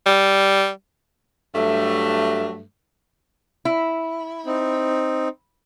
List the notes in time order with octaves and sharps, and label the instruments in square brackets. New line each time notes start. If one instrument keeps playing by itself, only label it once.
[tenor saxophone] G3
[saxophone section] G2 F#3 A3
[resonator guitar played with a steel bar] E4
[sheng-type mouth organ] C4 D#4